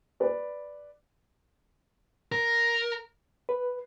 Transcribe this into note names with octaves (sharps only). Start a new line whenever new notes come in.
B4 D5
A#4
B4